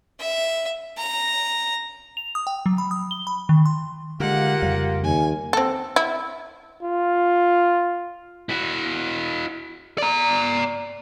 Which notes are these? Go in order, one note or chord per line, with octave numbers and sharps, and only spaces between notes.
E5
A#5
F7
D#6
G5
F#3
B5
D#6
G7
B5
D#3
C6
D3 G#3 A#3 F4 G4 F#5
F2 C#3 G3
D#2 G#5
C4 A4
E4
F4
E4 F#4
D5 A#5